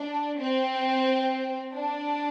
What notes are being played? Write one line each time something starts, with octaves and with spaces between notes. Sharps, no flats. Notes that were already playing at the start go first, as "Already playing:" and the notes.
Already playing: D4
C4
D4